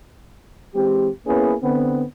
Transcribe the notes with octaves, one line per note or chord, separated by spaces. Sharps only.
E3 G#3 C4 G4
A#3 B3 C#4 E4 G#4 B4
D3 B3 C4